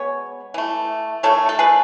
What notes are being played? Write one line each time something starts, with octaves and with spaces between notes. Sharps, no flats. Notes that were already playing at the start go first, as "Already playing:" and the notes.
Already playing: B2 G#3 B3 C#5
E3 A3
D#3 A3 A4 C#5
A4
G#4 B4